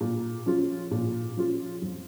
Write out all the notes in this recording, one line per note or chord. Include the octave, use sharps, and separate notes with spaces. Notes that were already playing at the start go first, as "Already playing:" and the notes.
A#2
F3 C#4 F4
A#2
F3 C#4 F4
F2